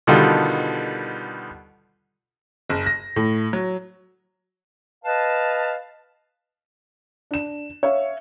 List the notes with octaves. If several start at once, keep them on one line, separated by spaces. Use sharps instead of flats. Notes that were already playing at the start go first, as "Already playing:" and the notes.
B2 D3 D#3 G3 F4 A4
F#1
A#6
A2
F#3
B4 D#5 F5 A5
D4 E7
C#5 E5 F5